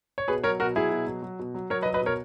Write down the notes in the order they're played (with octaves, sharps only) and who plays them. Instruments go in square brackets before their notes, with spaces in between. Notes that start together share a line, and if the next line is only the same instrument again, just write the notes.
[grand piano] C#5
B2 G#4 B4
F#3 A#4 C#5
B2 F#4 A#4
F#3 E4 G#4
B2
F#3
F#3
B2
F#3
F#3 A#4 C#5
B4 D#5
F#3
B4 D#5
B2 A#4 C#5